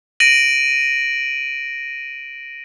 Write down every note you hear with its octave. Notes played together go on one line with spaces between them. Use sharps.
A#6 D7 D#7 F#7